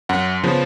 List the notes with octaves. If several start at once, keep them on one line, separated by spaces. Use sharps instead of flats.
F#2 F#5
C#3 F3 B3